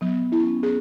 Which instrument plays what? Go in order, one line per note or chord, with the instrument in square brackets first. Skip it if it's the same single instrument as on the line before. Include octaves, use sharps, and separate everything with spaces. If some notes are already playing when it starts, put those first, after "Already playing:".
[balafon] F#3 [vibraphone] B3
[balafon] E4
[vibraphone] C#4
B3
[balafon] G#4